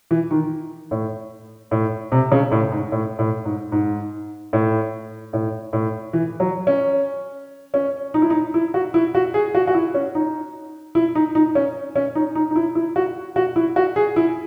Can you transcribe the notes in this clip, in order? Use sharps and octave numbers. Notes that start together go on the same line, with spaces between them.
E3
D#3
A2
A2
C3
C#3
A2
G#2
A2
A2
G#2
G#2
A2
A2
A2
E3
F#3
C#4
C#4
D#4
E4
D#4
E4
F#4
E4
F#4
G#4
F#4
F#4
E4
C#4
D#4
E4
D#4
D#4
C#4
C#4
D#4
D#4
D#4
E4
E4
F#4
F#4
E4
F#4
G#4
E4